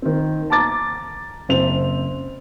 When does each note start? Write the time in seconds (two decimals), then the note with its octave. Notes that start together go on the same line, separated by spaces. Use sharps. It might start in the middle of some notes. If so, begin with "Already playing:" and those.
0.02 D#3 C4
0.50 A5 A#5 D6 A6
1.49 F#1 C4 F7